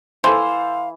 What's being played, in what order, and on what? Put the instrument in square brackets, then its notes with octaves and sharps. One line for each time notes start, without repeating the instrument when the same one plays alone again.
[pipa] E3 [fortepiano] A4 C5 [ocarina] F5 [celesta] C6